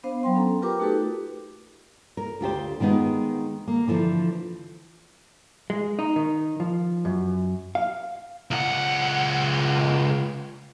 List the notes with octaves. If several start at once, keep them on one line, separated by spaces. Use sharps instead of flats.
B3 D4 C5 F5
F#3 B3 G5 C6
C#4 A4 A#5
F4 G4 A#4 B4 G5 D6
A3 D#4 F#4 G4 A4 B4
A#4
D2 F4 G4 C5
D#3 G#3 B3 D#4
A#3
D3 E3 F3
G#3
D#4
D#3
F3
F#2
F5
C#2 F#5